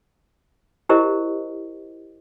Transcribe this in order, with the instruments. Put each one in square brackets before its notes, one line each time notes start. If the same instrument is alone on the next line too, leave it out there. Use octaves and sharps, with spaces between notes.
[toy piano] E4 G4 A#4 C5 D#5